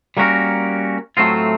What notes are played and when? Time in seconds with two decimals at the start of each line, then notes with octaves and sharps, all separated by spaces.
0.17 G3 A#3 C#4 F#4 A#4
1.17 A2 F#3 A3 C4 F4